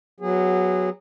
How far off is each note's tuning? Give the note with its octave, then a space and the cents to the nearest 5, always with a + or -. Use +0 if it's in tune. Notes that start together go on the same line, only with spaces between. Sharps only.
F#3 +0 B3 +0 G#4 -25